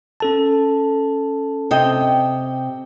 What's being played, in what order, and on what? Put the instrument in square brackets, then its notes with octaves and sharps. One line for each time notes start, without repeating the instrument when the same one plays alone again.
[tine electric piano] C#4 A4 A5
[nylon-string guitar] C3 D#5 G5